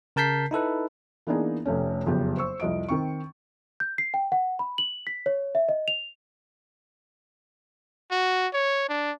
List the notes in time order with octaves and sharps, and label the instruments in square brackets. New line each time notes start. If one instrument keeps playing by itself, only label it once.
[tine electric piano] C#3 A#4 A5 G6 B6 C7
D#4 E4 A4 B4
[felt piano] E3 A#3 B3 D4 D#4 G#4
F1 C3 A3 C#4
F#1 F2 C#3 B3 G4
C5 C#6 E6
C2 F2 D#5 D7
D#3 C4 C#6
[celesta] G6
C7
G5
F#5
B5
F#7
B6
C#5
E5
D#5
F7
[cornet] F#4
C#5
D4